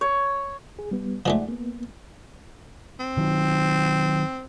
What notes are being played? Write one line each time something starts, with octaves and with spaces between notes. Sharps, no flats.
C#5
G#4
G3 B3
F3 G#3 A3 D#4 D5 F#5
A#3 B3
C4
D#3 F#3